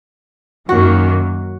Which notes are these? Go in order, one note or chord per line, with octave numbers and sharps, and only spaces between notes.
F#2 D#3 A#3 F#4